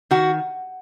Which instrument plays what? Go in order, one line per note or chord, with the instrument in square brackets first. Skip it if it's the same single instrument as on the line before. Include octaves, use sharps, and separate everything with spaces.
[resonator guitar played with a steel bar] D#3 F#4